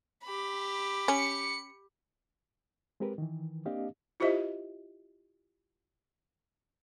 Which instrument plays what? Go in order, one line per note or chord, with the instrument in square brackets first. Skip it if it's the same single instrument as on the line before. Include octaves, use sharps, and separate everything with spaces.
[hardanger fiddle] G4 B5
[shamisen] C#4 [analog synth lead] C#7
[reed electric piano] G#3 C4 G4 A#4 B4
D#3 E3
A#3 C4 D4 G4 D#5 F5
[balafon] E4 F4 G4 C5 D#5 E5